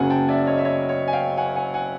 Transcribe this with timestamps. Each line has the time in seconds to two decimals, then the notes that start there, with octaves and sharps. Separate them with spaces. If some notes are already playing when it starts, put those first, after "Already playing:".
Already playing: F#1 F#2 C#3 F#3 A#3 F#5 G#5
0.10 G5 A5
0.29 D5 E5
0.46 C#5 D#5
0.58 E5
0.64 C#5 D#5
0.89 C#5
1.08 G#5
1.13 F5 G5
1.37 F#5 G#5
1.55 F#5 G#5
1.74 F#5 G#5